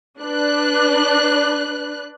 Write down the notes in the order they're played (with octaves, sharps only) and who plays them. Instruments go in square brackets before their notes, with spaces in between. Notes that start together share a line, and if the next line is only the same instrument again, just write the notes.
[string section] D4 B4 F#6